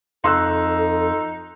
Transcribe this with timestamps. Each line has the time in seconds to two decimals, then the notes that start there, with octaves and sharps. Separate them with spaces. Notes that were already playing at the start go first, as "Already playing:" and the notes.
0.24 F2 D#4 A4 C6 E6 F#6